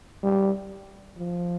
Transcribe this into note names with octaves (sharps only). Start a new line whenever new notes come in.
G3
F3